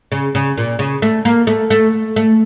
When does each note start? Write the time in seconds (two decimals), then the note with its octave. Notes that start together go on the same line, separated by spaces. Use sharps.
0.12 C#3
0.35 C#3
0.58 A#2
0.79 C#3
1.02 A3
1.25 A#3
1.47 A3
1.70 A3
2.16 A3